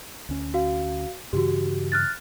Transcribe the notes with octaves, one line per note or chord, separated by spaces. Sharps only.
D2 C#4
F#4 F5
G2 C#3 E3 F#4 G4
F6 F#6 A6